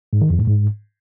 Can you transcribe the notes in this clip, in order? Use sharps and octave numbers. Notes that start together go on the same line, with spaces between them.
G#2
D#3
F2
A2
G#2